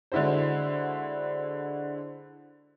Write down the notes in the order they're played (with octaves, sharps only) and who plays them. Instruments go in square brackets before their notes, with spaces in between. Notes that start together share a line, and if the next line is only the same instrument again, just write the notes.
[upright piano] D3 G#3 E4 F#4 C5